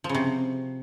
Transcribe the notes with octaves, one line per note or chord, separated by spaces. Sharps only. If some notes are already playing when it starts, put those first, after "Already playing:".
F3
C#3
C3